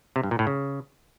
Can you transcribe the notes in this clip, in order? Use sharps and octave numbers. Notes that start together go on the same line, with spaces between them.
C3
G2
A#2
A2
C#3